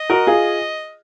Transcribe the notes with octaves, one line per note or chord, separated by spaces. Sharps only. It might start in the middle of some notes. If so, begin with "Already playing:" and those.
Already playing: D#5
F#4 A#4
F4 G#4